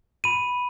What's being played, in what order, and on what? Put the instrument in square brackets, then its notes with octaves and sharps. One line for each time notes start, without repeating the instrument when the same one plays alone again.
[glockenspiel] B5 D#7